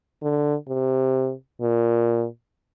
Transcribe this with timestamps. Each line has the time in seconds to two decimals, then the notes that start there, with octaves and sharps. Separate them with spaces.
0.22 D3
0.68 C3
1.61 A#2